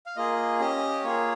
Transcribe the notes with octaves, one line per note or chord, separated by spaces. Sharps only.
F5
A#3 F4 G#4 D#5
C#4 G4 D#5
A#3 F4 G#4 C#5